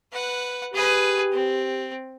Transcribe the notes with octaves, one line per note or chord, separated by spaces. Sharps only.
B4 F#5
G4 G#4 B4
C4